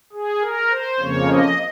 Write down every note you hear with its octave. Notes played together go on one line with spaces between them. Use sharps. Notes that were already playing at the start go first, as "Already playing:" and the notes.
G#4
A#4
C5
F2 C#3 F3 A#3 C#5
D#5